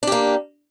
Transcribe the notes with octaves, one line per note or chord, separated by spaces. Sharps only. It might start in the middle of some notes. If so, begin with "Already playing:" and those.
A#3 D4 G4